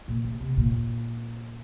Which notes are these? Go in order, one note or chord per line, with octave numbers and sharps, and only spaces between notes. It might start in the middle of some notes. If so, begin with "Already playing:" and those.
A#2
D#3
C3
A#2